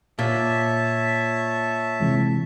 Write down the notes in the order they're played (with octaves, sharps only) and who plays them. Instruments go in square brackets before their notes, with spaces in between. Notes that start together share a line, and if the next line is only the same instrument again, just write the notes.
[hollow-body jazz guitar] A#2 [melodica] C#5 E5 A5
[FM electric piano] C3 E3 G#3